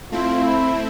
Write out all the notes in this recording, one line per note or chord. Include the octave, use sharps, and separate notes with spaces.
A3 C4 E4 F4
E4